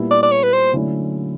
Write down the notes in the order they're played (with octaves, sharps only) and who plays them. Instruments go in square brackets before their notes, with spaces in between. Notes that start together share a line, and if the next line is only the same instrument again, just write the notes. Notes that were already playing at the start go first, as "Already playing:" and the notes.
Already playing: [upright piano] A#2 G3 B3 E4
[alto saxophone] D5
D5
C#5
B4
C5
[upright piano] D3 F#3 A3 C#4 E4